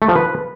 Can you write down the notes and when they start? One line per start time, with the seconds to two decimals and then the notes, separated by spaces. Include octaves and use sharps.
0.02 A3
0.09 F3
0.16 B4